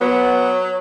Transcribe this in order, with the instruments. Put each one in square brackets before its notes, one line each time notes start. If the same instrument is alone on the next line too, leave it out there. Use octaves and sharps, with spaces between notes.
[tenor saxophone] F#3 [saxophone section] B3